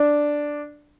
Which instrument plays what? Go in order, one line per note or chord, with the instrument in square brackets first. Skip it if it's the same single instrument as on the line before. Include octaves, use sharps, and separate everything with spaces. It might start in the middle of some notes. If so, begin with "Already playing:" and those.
Already playing: [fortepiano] D4